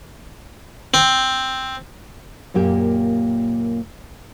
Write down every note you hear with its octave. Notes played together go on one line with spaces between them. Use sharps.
C4
F#2 A#2 A#3 G4 G5